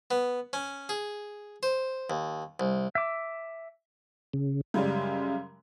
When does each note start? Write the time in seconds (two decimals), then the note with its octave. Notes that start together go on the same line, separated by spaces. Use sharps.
0.11 B3
0.53 C#4
0.89 G#4
1.63 C5
2.10 D#2
2.60 C2
2.95 E5 D6
4.33 C#3
4.74 F#2 C#3 G3 G#3